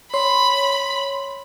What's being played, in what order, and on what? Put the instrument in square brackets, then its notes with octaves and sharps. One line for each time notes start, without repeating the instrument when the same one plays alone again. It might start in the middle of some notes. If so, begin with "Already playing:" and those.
[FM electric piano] C#5 C6 [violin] B5